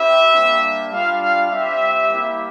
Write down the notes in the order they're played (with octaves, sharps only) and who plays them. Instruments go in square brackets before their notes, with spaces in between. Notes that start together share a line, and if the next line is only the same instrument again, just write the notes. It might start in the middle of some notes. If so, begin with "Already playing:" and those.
Already playing: [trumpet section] C4 E4 G4 E5
G3 A#3 D4
G3 D4 F4 F5
F5
G3 C4 G4 E5
G3 A#3 E4 G4